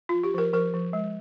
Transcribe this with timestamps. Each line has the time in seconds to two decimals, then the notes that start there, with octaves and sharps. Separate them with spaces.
0.09 F3 F4
0.23 G4
0.34 F3 A#4
0.53 F3 A#4
0.74 F3
0.93 G#3